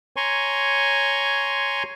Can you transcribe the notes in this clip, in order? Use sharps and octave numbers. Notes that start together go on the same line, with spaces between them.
C#5 G#5 A#5 C6 C#6